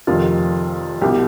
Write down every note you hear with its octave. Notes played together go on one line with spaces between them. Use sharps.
F1 F2 C3 D#3 F4
C2 B2 G4